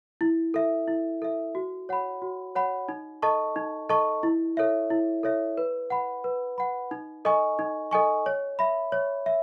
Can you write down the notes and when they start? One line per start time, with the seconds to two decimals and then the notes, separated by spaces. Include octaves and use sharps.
0.21 E4
0.54 A4 E5
0.88 E4
1.22 A4 E5
1.55 F#4
1.89 C#5 F#5 B5
2.22 F#4
2.55 C#5 F#5 B5
2.89 D#4
3.22 A4 D#5 A5 C#6
3.56 D#4
3.89 A4 D#5 A5 C#6
4.23 E4
4.57 A4 C#5 E5
4.90 E4
5.23 A4 C#5 E5
5.57 B4
5.90 F#5 B5
6.24 B4
6.58 F#5 B5
6.91 D#4
7.25 A4 D#5 G#5 C#6
7.59 D#4
7.91 A4 D#5 G#5 C#6
8.26 C#5
8.59 E5 B5
8.92 C#5
9.26 E5